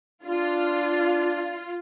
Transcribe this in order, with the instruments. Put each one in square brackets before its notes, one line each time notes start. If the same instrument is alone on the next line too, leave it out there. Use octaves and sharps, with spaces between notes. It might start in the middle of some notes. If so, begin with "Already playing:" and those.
[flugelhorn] D4 [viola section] F4